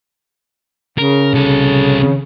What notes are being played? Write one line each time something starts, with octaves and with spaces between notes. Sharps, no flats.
C#3 A#4
C2 A4